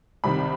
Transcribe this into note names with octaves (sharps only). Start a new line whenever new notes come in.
C2 C3 D#3 B5